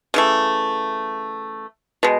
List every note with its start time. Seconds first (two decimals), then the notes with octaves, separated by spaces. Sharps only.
0.14 C#3 E3 A3
2.03 B2 G#3